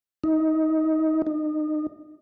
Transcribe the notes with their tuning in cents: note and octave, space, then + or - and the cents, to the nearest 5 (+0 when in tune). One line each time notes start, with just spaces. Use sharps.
D#4 +20
D#4 -30